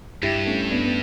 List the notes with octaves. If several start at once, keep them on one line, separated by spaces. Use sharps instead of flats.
G2 E4 G4
A3 C#4
B3 D4
B3